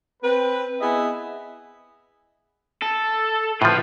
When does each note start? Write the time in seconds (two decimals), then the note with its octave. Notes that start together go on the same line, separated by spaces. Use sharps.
0.23 C4 B4
0.80 B3 E4 G#4 D#5 E5
2.82 A4
3.62 A2 F3 F4 B4